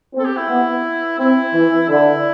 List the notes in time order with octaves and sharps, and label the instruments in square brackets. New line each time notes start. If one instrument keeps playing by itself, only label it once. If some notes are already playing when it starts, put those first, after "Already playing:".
[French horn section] C4
[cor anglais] A4
G4
E4
[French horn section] B3
[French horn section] C4 [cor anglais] E4
[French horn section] E3
[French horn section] D3 [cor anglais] E4